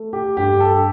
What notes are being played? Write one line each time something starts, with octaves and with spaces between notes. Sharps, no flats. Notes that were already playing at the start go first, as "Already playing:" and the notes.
Already playing: A3
G4
G2 G4
A4